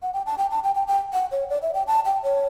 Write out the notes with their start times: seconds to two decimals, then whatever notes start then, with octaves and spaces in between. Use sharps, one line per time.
0.02 F#5
0.13 G5
0.26 A5
0.38 G5
0.51 A5
0.64 G5
0.75 G5
0.87 G5
1.13 F#5
1.31 C#5
1.50 D5
1.62 E5
1.74 G5
1.87 A5
2.05 G5
2.23 C#5